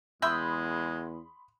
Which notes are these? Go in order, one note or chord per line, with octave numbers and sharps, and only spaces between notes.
E2 G#3 E5 G5 B5 C6 D#6